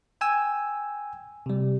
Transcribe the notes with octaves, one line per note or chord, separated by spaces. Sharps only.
G5 G#5 E6
C3 G3